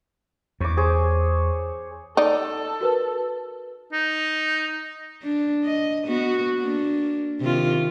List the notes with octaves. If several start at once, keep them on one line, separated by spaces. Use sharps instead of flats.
E2 C#5 D6
G#4 C5 C#5
D#4 A4 D5
F#4 A#4 B4
D#4
D4
D#5
B3 F#4
A#3 D4
C3 D#3 F4